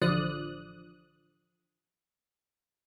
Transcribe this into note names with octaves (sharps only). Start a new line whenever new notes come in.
A1 D3 F3 D5 D#6 F#6